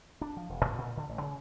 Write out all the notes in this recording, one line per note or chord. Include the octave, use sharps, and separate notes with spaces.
D4
F3
E1
G#2
A#2
D3
A1
C#3